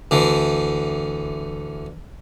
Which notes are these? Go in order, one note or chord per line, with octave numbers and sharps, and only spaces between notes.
D2 D3 E3